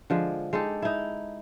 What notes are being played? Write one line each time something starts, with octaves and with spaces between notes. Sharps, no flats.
D3 F3 G#3
G#3 D#4 G4 A4
D#4 E4